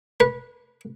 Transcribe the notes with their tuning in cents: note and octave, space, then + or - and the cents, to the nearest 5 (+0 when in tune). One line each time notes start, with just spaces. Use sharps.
B4 -15